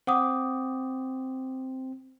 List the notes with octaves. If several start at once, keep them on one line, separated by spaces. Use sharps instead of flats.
C4 F#5 D6 D#6